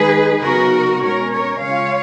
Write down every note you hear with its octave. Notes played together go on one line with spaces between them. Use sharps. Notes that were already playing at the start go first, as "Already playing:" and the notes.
Already playing: D#3 G#3 D#4 G#4 B4
C#3 F#3 B3 D#4 F#4 A#4
B2 G#3 C#4 A#4 C#5
A#4 C#5
C#3 G#3 C#4 F4 C#5 F5